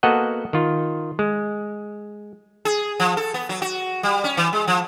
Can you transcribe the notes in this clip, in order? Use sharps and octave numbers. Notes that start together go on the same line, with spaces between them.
A#3 B3 F#4 A4 D#5 F#5
D#3 F4
G#3
G#4
F3
A4
B3
F#3
F#4
G3
C#4
E3
G#3
F3